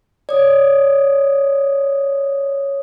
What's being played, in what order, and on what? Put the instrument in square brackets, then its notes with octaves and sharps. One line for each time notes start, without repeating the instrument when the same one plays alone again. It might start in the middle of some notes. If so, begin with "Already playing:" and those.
[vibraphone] C#5 D#6 [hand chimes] D5